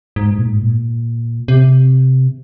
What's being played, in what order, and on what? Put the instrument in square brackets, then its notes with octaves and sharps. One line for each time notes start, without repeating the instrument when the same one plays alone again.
[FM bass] G#2
G2
A#2
G#2
A#2
C3